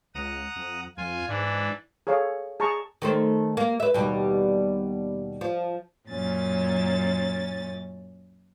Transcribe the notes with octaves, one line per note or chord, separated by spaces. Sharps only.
C#2 F#5 A#5 D#6
F2
F2 F4 G#5
G#2 E3 D4
G#4 A4 C#5 F5
G#4 A5 A#5 C#6
D#3 A3 C5
A#3
B4 E5
D#2 B2 G3
F3
F#2 A#2 C#4 A6